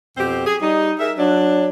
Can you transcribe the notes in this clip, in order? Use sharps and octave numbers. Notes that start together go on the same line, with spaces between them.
F2 B2 C4 G4 C5
G#4
G3 D#4
G#4 A#4 E5
F#3 D4